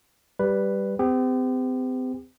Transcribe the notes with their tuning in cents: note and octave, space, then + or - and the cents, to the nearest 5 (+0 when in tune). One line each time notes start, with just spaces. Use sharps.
G3 +0 B4 +0
C4 -40 G4 +40